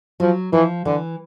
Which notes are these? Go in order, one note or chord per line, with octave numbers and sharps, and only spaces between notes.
F3 F#3
E3 F3
D3 E3